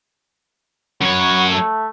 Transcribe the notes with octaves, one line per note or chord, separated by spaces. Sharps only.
F#2 F#4 B4 C#5 C#6
A3